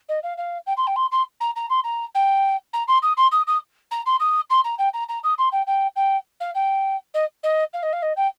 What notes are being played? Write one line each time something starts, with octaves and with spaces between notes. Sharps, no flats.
D#5
F5
F5
G5
C6
G5
C6
C6
A#5
A#5
C6
A#5
G5
A#5
C6
D#6
C6
D#6
D#6
A#5
C6
D#6
C6
A#5
G5
A#5
A#5
D#6
C6
G5
G5
G5
F5
G5
D#5
D#5
F5
D#5
F5
D#5
G5